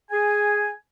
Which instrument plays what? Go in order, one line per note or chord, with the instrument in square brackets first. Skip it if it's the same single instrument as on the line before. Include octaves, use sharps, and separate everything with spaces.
[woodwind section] G#4 G#5